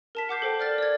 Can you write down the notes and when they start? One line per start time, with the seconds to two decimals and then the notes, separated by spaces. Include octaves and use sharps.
0.15 A#4 A5 B6
0.29 F#5 D6 G6 C7
0.42 A4 C5 G5
0.60 D5 F6 A6
0.78 D5 G#6